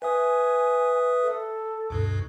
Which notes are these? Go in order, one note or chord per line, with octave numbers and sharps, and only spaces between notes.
B4 E5 G#5 D#6
A4
D2 G2 B2